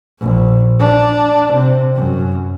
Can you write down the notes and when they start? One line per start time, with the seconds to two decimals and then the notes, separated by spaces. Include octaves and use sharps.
0.20 A#1
0.80 D4
1.52 C3
1.95 F#2